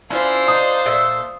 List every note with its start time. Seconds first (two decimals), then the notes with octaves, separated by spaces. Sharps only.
0.10 C#4 D4 E4 F4 C5
0.48 D4 D#4 D#6
0.86 A#2 A4 E5